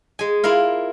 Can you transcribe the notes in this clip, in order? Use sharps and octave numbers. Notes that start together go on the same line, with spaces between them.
G#3 G#5
E4 F4 A#4 F5